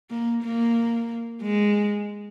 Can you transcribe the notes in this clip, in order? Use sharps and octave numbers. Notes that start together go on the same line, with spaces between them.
A#3
A#3
G#3